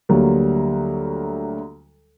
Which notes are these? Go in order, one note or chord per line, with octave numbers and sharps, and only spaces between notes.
D2 F#3 G3 A#3